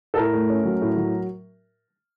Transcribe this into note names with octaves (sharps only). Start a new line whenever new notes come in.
A4
A2 A#4
A3
C#4
F#3
A2
F#3